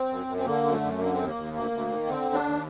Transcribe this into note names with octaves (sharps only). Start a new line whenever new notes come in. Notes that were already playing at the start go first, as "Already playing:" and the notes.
Already playing: C4
F#2
F#2
C4
D3 A#3
F#2
A3
F#2
D3 A#3
D#2 C4
A#3
D#2
D2 A#3
D2
D#3
D3 C4
D#2
D4
D#2